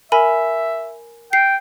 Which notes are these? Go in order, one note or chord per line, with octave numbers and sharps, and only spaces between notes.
A#4 E5 G#5 B5
G5 C7